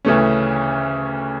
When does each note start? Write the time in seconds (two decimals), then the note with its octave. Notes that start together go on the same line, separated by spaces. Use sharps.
0.05 D2 C#3 E3 A3 C#4